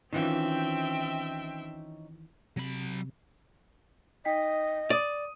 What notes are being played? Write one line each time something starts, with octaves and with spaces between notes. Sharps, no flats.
D#3 E3 C4 C#4 D#4 F4 E5 G5
C3 F#3 B5
D#4 D#5 G5 B6
D5 D#6 D#7